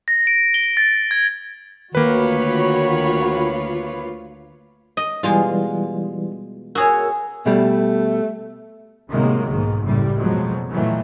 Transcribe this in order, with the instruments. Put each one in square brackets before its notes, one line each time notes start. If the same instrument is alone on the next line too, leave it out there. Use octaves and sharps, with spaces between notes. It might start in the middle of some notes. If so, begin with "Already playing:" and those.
[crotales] A#6
D7
G7
A6
G#6
[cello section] D2 F4 [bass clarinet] D#3 [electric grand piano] A#3 B4 [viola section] F#4 C#5 B5
[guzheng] D#5
[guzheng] B2 G#3 F4 [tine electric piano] E3 G3
[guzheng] F#4 G#4 C#5 [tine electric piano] A#4 E6
[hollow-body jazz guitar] B2 G3 [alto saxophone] A3
[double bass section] A2 C3 D#3 F#3 G#3 A#3
B1 G#2 D#3
F#1 A2 G3
F2 B2 F3 F#3 G#3
A#2 D#3 E3 F#3 A3